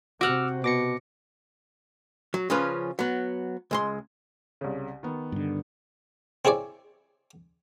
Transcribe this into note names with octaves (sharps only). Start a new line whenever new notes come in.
C3 F#4 F#5 D6 E6 F6
B2 D6 A#6 C#7
F#3
C#3 F3 C#4 F4 B4
F#3 B3
C#2 G#3 C6
C2 C#3
D#3 B3
G2 D3
C4 E4 G#4 C#5 D5